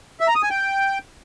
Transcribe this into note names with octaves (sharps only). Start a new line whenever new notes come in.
E5
A#5
D#6
G#5
G5